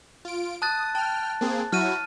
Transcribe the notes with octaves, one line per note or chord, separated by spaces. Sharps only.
F4 D7
A5 D#6 F#6 A6
G5 A5 F6
A#3 C4 G#4
F#3 E4 F#4 F6 D#7